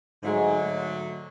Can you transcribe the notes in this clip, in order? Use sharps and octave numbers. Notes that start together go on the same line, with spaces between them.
G#2 D3 F#3 G#3 A3